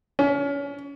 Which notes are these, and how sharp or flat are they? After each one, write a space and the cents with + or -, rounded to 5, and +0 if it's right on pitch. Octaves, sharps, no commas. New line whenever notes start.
C#4 +30